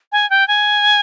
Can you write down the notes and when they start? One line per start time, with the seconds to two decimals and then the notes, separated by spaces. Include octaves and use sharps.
0.12 G#5
0.30 G5
0.48 G#5